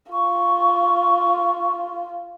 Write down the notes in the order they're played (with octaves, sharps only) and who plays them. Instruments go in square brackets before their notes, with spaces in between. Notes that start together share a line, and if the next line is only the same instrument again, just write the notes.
[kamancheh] F4 [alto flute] C#6